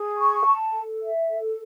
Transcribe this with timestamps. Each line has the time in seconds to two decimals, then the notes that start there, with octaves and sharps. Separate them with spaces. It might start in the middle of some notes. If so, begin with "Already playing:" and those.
Already playing: G#4
0.17 C#6
0.45 A5
0.73 A4
1.02 E5
1.29 A4